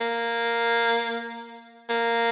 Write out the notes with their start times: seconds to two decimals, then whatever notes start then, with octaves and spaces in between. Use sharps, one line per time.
0.01 A#3
1.89 A#3